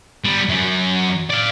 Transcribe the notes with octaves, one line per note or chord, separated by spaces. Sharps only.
G3 B3
F#2 F#3
D5 F5